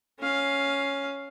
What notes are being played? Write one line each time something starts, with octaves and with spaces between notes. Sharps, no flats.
C#4 F5